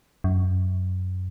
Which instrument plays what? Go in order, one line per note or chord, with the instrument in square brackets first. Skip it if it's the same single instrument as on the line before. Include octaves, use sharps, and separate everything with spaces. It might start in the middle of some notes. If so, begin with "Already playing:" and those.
[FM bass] F#2